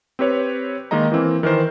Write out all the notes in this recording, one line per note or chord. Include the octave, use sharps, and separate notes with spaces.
C4 G4 B4 C#5
D#3 G#3 A#3 D#5 A#5
E3 A#3 C4
D#3 E3 A#4 C5